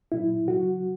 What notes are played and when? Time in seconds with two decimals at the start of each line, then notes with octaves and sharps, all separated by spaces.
0.12 A#2 F#3 E4
0.47 C#3 F#3 F#4